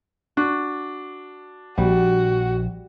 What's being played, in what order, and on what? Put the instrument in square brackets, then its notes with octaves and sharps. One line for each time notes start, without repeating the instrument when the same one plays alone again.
[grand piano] D4 [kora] F#4
[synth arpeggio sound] A#1 [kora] G3 [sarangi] F#4